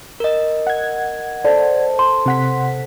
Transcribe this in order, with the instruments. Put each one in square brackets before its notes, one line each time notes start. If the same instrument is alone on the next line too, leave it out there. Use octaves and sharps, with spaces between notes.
[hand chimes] A#4 D#5
[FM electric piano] F#5 G#6
[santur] A4 C5 D#6 [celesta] D5
[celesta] C6
[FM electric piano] C3 F#5 B6